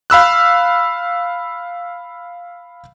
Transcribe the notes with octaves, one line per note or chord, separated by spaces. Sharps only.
F5 B5 E6 F#6